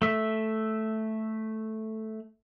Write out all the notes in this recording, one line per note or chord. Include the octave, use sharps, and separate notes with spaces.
A3 E5